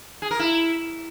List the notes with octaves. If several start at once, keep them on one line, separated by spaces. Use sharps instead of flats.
G#4
A#4
E4